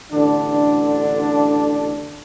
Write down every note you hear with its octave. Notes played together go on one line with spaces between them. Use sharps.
A1 D3 D4